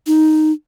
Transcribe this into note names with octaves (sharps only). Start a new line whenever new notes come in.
D#4